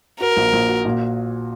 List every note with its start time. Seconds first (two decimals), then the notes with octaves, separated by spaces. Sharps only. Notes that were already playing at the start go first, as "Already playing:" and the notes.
0.20 F#4 A#4
0.37 A#1
0.53 A#1
0.69 F#4
0.85 A#2